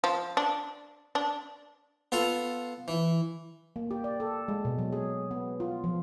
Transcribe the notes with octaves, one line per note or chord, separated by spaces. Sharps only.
F3
D4
D4
B3 F4 A4 F5
E3
A#3
G4
D5
A4
G#3
B2
F#3
G#4
B3
F4
F3